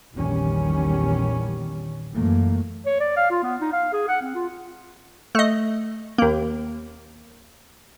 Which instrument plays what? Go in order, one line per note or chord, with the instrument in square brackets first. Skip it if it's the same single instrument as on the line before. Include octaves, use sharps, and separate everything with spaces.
[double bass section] A#1 E2 D#3 G3 C#4
F#2 A#2 E3 A3 A#3
[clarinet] C#5
D5
F5
F4
B3
D#4
F5
G#4
F#5
C4
F4
[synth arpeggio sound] A3 D#5
D#2 A#3